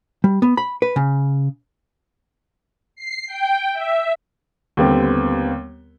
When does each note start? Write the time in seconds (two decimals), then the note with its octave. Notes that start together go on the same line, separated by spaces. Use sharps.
0.24 G3
0.42 B3
0.57 B5
0.82 B4
0.96 C#3
2.96 C7
3.27 G5
3.73 E5
4.77 D#2 D3 G3 B3 C4